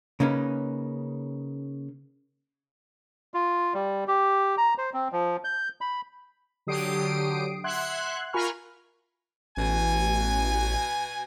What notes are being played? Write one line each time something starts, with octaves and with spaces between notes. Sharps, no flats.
C#3 A#3 C#4 D#4 B4
F4
G3
G4
A#5
C5
C4
F3
G6
B5
D3 F#3 G4 D#6 C7 D7
E5 F#5 C6 F#6 G#6
F4 A#4 G#5 B5 C#6 F6
A1 B2 G#5